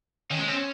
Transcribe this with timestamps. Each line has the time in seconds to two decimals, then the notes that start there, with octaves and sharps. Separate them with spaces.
0.31 D#3 C#4
0.39 G#3
0.48 C4 C#4